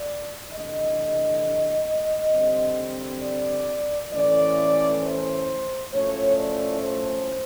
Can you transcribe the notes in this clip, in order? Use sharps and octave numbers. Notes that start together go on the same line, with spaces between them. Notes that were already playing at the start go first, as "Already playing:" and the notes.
Already playing: D5
C3 E3 A3 D4 D#5
D3 G3 C4
D5
A2 E3 A3 C#4 D5
C5
A2 F3 A3 C#4 C#5
D5
C5